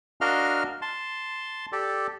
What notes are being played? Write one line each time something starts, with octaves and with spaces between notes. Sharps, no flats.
D4 F#4 A#4 D#5 F5 F6
A5 C6
G4 A4 D5